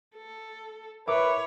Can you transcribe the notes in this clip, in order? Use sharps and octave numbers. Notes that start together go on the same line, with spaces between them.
A4
E4 A#4 B4 C#5 E5 D6